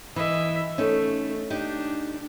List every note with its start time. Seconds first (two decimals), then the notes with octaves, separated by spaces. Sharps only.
0.16 E3 D#5 E5
0.78 A3 C#4 D#4
1.50 D4 D#4 G4